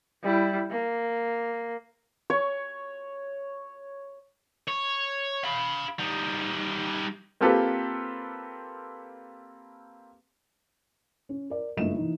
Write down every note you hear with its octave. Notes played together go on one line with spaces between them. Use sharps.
G3 E4
A#3
C#5 C#6
C#5
F5 B5
G3 D#4
A#3 C4 F4 G4 A4 B4
C#4
A#4 D5
F#1 G2 A3 F4 D#5 E7
E3 D#4